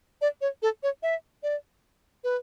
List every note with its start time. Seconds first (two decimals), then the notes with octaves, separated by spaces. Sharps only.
0.21 D5
0.41 C#5
0.62 A4
0.83 C#5
1.03 E5
1.43 D5
2.24 B4